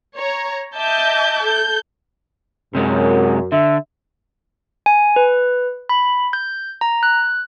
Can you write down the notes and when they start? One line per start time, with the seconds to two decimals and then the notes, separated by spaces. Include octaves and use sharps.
0.15 C#5 A#5
0.75 D#5 E5 A5 D6 G6
1.44 A4 G6
2.75 F#2 C3 G#3
3.52 D3 E5
4.86 G#5
5.16 B4
5.89 B5
6.33 G6
6.81 A#5
7.03 F#6